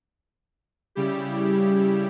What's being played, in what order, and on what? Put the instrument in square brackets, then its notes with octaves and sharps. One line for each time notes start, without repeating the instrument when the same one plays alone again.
[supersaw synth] C#3 G3 E4 G4